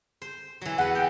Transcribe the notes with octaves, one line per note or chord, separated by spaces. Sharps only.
C5
E3 F#3
E2 B4 F#5
B3 G5